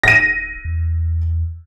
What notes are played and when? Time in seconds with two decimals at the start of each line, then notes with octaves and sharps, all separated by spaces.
0.03 D1 A#6 D#7
0.65 E2